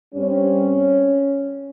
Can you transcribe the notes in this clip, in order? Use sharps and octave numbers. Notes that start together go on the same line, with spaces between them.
G2 G3 C4 C#4